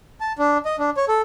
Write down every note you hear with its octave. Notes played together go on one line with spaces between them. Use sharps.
A5
D4
D#5
D4
C#5
A4